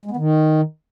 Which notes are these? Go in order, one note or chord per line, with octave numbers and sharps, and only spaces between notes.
G#3
B3
D#3